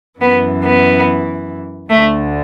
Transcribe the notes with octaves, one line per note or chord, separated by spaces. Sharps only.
F#2 E3 B3
B3
D2 D3 A3